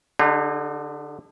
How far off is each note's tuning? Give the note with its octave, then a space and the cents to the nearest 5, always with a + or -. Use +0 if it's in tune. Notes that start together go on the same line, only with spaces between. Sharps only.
D3 +0 D#4 -40 G4 +45